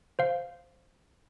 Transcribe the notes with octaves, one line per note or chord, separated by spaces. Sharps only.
C5 F5